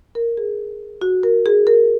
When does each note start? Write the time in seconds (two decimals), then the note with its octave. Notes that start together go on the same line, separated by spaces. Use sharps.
0.15 A#4
0.37 G#4
1.02 F#4
1.23 A#4
1.46 G#4
1.67 A#4